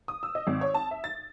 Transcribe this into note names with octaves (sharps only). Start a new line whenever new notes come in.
D#6
E6
D#5
G#1
C#5
A5
E5
A6